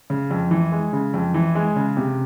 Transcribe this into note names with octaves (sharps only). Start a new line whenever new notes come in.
C#3
F2
E3
G#3
C#3
F2
E3
G#3
C#3
C3